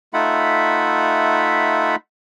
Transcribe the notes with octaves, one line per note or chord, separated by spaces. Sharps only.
A3 D#4 F4 E5 F#5 B5